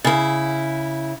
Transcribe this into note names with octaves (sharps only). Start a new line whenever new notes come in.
C#3 E4